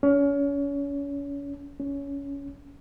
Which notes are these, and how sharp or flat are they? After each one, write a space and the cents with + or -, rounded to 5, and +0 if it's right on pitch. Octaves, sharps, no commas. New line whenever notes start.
C#4 +30
C#4 +15